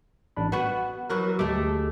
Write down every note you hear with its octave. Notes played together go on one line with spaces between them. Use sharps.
A1 D4 B5
B3 F#4 B4 F#5
E3 F#3 F#4 A#4 B4
D2 G#3 A3 G4 D6